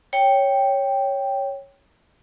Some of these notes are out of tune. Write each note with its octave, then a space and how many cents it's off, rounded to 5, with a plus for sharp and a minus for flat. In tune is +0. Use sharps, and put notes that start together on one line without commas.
C#5 +0 G5 +0